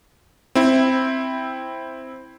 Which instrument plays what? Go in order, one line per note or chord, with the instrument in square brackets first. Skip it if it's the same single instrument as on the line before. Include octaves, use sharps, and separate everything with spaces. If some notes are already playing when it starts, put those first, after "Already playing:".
[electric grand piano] C4 E4